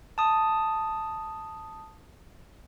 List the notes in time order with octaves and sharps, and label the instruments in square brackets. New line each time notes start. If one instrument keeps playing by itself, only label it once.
[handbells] A5 D#6